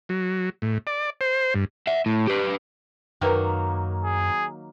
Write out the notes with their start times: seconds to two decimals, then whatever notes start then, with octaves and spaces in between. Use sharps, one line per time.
0.09 F#3
0.62 A2
0.87 D5
1.21 C5
1.54 G2
1.87 E5 F#5
2.06 A2
2.28 G4 B4
3.21 F#2 D#3 F#3 A#3 A#4 B4 G5
4.05 G#4